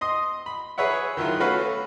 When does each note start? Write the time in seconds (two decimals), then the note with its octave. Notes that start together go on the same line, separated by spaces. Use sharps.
0.01 D#5 C6 D#6
0.46 B5
0.78 G#4 B4 C#5 E5 F#5
1.17 D#3 F#3 E4 F4
1.40 A3 C#4 F#4 B4 F5 F#5